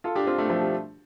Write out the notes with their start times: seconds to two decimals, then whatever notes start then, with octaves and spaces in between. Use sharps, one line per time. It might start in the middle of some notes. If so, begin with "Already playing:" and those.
0.04 F4 A4
0.15 D4 G4
0.27 C4 F4
0.38 A3 D4
0.49 F3 A3
0.61 G3